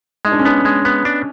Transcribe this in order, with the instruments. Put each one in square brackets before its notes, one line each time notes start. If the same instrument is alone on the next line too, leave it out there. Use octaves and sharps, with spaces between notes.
[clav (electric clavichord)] G#3 [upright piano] D#4
[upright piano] D4
C#4
[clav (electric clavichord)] B3 [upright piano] D4
[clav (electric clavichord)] G#3
B3
D4